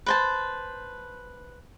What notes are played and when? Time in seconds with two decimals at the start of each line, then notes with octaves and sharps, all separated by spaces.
0.06 B4 C5 A5